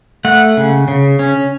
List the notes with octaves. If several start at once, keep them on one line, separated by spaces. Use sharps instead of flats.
A3 F#5
C#3
C#3
C#4